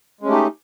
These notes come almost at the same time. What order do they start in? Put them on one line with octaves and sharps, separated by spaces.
G#3 C#4 A3 G4 D#4